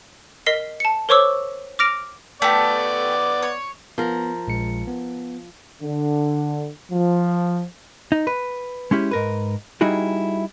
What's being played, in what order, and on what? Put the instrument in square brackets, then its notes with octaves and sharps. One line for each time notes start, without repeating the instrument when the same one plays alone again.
[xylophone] A#4 D#5 B6 C7
A5 C#7
A#4 C5 C#5 C#6 D6 E6
D6 F6 A#6 D7 F7
[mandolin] A3 G4 [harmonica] B3 D5
[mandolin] C#5
[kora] F3 A#4 [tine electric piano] B3
[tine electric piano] A#1 G#3 C#7
B3
[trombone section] D3
F3
[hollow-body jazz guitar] D#4
B4
G#3 C#4 E4 G4
G#2 A#4 B4
G3 D#4 E4 F#4 G#4